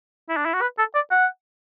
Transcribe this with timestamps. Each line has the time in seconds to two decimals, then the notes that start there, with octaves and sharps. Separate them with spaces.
0.29 E4
0.37 D4
0.45 E4
0.54 F#4
0.61 B4
0.78 A4
0.95 D5
1.11 F#5